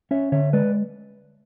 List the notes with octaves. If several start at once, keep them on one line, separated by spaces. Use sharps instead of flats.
C#4 C#5 E5
D3 C#5 E5
G#3 B4 D5